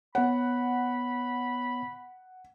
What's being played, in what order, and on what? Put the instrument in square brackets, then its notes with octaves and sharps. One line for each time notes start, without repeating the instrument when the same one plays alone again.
[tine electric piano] B3 C#5 [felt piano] F#5 [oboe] B5